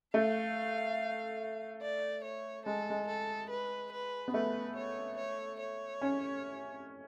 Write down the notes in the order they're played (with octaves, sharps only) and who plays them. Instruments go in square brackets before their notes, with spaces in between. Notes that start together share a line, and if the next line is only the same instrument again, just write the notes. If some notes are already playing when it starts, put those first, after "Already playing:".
[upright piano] A3 [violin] F5
[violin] D5
C#5
[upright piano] G#3 [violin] A4
[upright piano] G#3
[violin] A4
B4
B4
[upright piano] B3
[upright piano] A3 [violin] B4
[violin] C#5
C#5
C#5
[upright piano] C#4